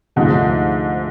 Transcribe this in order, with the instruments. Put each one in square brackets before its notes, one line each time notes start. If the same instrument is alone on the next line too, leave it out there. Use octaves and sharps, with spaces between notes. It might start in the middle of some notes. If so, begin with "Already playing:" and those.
[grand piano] D2 C3 F3 A3 [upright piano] G#2